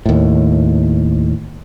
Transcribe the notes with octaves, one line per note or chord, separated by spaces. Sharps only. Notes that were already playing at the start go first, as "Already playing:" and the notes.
D#2 A2